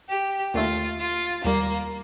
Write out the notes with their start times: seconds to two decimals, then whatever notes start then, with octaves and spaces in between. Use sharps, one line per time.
0.09 G4
0.54 D#2 D3 A3 F4
1.00 F4
1.44 D#2 D#3 G3 A#3